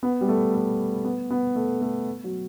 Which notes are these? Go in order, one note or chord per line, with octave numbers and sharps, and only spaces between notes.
B3
G3
A3
A3
B3
B3
A3
A3
F#3